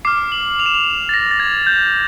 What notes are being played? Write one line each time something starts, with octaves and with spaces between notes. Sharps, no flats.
D6 F6 C7
F#7
F7
E7
F7
A6
A#6
A6
G#6
G6